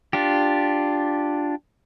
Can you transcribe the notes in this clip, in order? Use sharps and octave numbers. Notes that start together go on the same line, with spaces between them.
D4 F4 G4